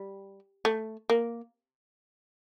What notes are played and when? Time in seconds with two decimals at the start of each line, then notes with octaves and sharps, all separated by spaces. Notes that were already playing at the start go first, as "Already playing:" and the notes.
Already playing: G3
0.65 A3
1.10 A#3